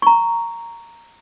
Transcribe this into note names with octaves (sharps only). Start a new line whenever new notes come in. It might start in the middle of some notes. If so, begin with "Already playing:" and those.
A#5 C#6